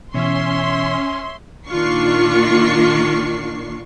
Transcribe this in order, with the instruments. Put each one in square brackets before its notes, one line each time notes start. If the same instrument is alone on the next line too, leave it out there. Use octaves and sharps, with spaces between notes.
[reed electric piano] B2 E3 [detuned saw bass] C#4 [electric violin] C#5 E5 [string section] C6
[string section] A#2 D#3 D4 F4 C#6 C7